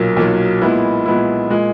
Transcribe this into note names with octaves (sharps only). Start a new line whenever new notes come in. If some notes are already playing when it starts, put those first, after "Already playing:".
Already playing: B1 A#2 F#3 A#3
B1 A#2 F#3 A#3
A#2 G#3 B3 E4
A#2 G#3 B3 E4
A#2 G#3